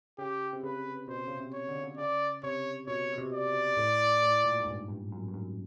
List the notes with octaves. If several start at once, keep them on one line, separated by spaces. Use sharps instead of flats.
C#3 G4
C3
C#3 B4
B2 C5
C#3
C3
C#5
D3
C#3
D3
C#3 D5
C3 C#5
B2 C#5
B2
C3
D5
C3
A2
A2
A#2
G#2
G2
G2
F#2
G2
F#2